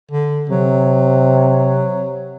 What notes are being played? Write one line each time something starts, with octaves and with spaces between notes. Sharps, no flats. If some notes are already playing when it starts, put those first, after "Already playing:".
D3
C3 F#3